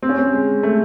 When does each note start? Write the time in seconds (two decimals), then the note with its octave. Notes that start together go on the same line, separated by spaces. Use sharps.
0.03 C4
0.09 C#4
0.18 C4
0.33 G#3
0.63 A3